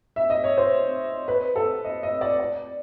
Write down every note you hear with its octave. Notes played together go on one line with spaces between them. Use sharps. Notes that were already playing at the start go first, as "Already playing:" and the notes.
E5
D#5
C#5
C5
B4
A4
D#5
D#5
D5
D5